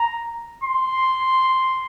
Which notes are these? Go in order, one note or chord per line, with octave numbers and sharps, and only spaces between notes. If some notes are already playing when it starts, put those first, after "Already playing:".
Already playing: A#5
C6